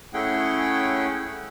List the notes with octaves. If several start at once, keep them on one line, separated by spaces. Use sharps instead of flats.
A3 C#4 E4 G#4 F#5 G5